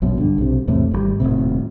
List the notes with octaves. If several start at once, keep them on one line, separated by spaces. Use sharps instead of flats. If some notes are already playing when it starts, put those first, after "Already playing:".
A#1 F#2 B2
G2 D3
B1 C3
E2 A2 C3 A3
G#1 D#3 G3
D#1 B1 A2 C3